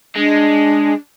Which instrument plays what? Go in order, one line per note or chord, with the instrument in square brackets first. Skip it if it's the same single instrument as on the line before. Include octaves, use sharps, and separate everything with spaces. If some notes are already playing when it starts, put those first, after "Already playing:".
[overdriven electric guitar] G#3 [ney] D4